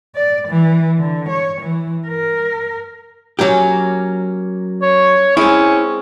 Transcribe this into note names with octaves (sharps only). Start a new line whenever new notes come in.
D5
E3
D3
C#5
E3
A#4
F#3 A#3 C#4 G4
C#5
G#3 C4 C#4 E4